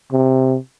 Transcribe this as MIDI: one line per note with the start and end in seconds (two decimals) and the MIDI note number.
0.12 0.57 48